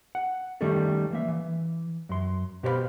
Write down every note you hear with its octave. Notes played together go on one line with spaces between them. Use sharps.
F#5
D#3 G3 A3 C#4 A4
E3 A#3 E5
E3
F#2 C6
B2 G4 C5 C#5 F5 B5